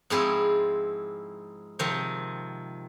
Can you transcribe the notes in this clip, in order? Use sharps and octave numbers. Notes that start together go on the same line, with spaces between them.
G#2 F3 C4 E4 F4 G#4
C3 D#3 F3 C4